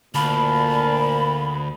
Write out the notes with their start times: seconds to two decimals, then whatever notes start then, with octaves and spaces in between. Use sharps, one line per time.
0.15 D2 A#2 F5 A5 B5